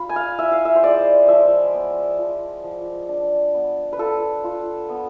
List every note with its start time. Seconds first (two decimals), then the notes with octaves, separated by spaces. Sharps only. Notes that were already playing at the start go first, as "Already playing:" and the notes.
Already playing: F4 B5
0.09 G#5
0.16 F5
0.39 E4 E5
0.52 F5
0.65 E5
0.76 C5
0.83 G#3 D5
1.28 F3 E5
1.73 B3
2.19 F3
2.64 F3
3.09 D4
3.54 B3
3.93 B4
3.99 F4 A4
4.44 F4
4.89 B3